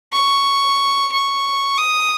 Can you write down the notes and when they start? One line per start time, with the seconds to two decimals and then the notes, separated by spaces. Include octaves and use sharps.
0.13 C#6
1.12 C#6
1.78 D#6